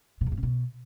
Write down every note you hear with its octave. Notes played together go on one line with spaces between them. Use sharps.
B2
E2
G2
C3
B2